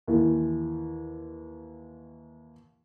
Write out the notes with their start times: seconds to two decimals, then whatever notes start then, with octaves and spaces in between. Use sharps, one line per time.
0.08 D#2 E3